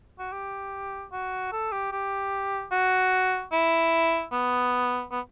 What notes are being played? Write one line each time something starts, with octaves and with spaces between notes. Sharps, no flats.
F#4
G4
F#4
A4
G4
G4
F#4
E4
B3
B3